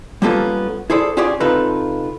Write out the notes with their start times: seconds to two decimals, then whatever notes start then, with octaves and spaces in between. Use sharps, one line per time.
0.22 G3 A#3 B3 C#4 F4 A4
0.90 E4 G#4 A4 C5 D5
1.17 C#4 F4 G4 G#4 C#5 D5
1.40 C3 D#4 F4 A4 B4